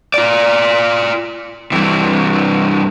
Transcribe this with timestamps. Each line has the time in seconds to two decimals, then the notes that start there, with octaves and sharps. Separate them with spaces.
0.14 F4 D5
1.72 G2 E3